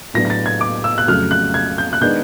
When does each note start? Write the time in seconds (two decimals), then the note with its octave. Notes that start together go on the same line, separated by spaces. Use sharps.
0.14 A2 F#3 B3 D4 A#6
0.25 A#6
0.30 A6
0.46 G#6
0.61 D6
0.84 E6
0.98 F#6
1.08 F2 C#3 F#3 A3 F6
1.31 F#6
1.54 G#6
1.78 G6
1.93 F#6
2.01 D#3 G#3 B3 D4 G6